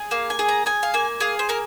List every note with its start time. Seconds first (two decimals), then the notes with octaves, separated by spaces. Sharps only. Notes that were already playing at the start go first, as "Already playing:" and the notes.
Already playing: G#4
0.11 A#3 F5
0.30 G#5
0.39 G#4
0.49 A#5
0.66 G#4 G#5
0.83 F5
0.94 A#3 G#5
1.20 G#4 F5
1.39 C5
1.49 A#3 A#4